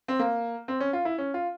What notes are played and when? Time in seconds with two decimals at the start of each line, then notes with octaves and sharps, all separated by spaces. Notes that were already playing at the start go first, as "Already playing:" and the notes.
0.08 C4
0.19 A#3
0.68 C4
0.80 C#4
0.93 F4
1.05 E4
1.18 C#4
1.34 F4